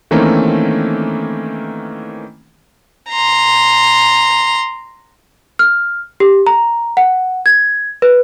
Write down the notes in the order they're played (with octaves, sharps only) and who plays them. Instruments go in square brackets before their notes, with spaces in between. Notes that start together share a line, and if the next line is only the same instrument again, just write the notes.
[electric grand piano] D#3 E3 A3 A#3 C4 C#4
[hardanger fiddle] A#5 C6
[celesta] F6
G4
A#5
F#5
G#6
B4